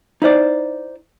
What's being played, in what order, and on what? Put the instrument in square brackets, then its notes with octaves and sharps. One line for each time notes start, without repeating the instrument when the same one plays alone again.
[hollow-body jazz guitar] D#4 E4 C5 D5